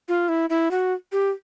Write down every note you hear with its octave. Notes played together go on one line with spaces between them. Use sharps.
F4
E4
E4
F#4
G4